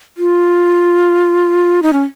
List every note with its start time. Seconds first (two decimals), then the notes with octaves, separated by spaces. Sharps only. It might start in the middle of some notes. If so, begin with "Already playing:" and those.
0.17 F4
1.83 D#4
1.93 C#4